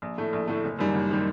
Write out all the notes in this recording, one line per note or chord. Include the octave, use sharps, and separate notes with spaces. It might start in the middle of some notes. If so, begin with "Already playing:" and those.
A#1
A2 A3
A#1
A2 A3
F#1
F#2 D#3 G3
F#1
D#3 G3